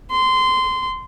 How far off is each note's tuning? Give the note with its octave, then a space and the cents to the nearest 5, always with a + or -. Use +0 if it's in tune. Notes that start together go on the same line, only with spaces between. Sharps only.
C6 -15